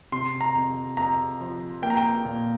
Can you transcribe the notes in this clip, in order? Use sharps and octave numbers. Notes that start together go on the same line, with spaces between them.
C3 C6
A#5
F2
F2 A#5
F3
A#3 G5
A#5
G5
A#2